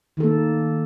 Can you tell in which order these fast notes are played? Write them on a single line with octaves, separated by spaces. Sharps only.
D#3 A4 A#3